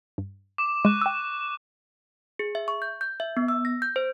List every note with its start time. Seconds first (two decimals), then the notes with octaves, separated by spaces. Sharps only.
0.18 G2
0.58 D6 E7
0.85 G#3 C#6 F#6
1.01 G5 E6
2.39 G#4
2.55 E5
2.68 C#6
2.82 G6
3.01 G6
3.20 E5
3.37 B3
3.48 E6
3.65 A#6
3.82 G6
3.96 C5